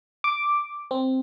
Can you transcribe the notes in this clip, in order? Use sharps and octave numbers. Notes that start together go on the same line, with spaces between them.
D6
C4